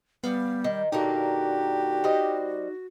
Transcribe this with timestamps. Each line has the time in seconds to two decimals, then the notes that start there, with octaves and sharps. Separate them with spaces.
0.24 G3 B3 F5
0.64 D#3
0.92 A#2 D3 A#3 D#4 F#4 G4
2.04 G3 C5 D#5